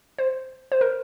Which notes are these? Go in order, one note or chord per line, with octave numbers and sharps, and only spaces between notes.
C5
C5
A#4